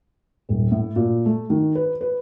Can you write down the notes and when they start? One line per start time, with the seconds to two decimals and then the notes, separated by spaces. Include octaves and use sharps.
0.49 D#1
0.72 A2
0.96 A#2
1.26 A3
1.50 D#3
1.75 B4
2.01 B4